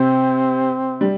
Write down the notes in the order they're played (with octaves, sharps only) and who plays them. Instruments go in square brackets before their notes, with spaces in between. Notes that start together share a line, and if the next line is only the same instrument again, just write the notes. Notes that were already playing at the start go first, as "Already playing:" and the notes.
Already playing: [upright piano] C3 [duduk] C4
[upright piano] G3